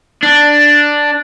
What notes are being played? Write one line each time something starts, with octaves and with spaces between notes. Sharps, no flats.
D4